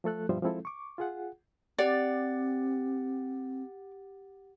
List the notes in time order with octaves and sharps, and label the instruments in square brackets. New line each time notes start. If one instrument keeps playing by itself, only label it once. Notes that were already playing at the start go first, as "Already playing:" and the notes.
[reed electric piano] F3 A3 A4 F#6
G2 B2 F3 G3 C5 E5
F3 G#3 C4 E4 A4
C#6 D6
F4 G#4 F#5
[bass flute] C4 [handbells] G4 F#5 A6 [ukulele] D5